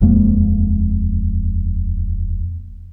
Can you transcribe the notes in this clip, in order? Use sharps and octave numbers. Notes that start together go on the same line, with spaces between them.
D#1 F2 G#3 A#3